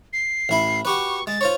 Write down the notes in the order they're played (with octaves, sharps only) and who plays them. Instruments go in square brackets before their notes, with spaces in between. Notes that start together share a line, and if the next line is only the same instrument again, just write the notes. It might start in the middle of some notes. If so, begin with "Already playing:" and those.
[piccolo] C7
[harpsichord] A1 E4 B5
[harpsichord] F#4 G4 B4 [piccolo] C#6
[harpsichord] G#3 [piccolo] A6
[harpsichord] F4 C5 C#5